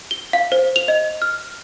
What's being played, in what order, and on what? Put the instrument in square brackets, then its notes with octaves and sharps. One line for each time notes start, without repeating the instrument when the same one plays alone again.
[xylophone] G7
F5
C5
F7
D#5
F6